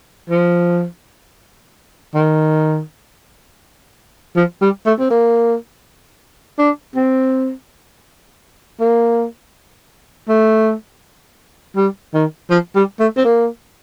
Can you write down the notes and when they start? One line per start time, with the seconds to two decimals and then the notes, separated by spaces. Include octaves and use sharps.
0.30 F3
2.15 D#3
4.36 F3
4.61 G3
4.86 A3
4.99 C4
5.11 A#3
6.59 D4
6.96 C4
8.80 A#3
10.29 A3
11.76 G3
12.14 D#3
12.50 F3
12.76 G3
13.00 A3
13.17 C4
13.25 A#3